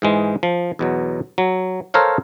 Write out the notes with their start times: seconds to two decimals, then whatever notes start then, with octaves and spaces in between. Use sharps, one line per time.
0.02 G#2 E3 G#3
0.43 F3
0.79 E2 B2 F#3
1.38 F#3
1.94 A4 A#4 C5 C#5 F5